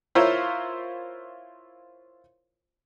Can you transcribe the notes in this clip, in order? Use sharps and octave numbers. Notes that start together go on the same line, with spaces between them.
E4 F4 A#4 C5 C#5 E5